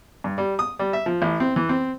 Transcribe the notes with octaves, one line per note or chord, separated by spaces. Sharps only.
G2
G3
D#6
G3
E5
F3
A1
C4
E3
C4